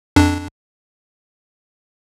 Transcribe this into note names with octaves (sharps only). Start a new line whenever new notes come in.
F2 D4